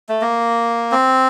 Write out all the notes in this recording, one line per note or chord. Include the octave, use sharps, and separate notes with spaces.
A3
A#3
C4